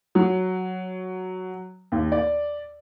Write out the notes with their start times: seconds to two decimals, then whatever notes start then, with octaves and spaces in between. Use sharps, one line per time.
0.15 F#3
1.92 D#2
2.12 D5